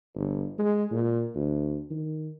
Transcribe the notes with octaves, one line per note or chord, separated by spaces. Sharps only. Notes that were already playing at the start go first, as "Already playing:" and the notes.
G1
G#3
A#2
D2
D#3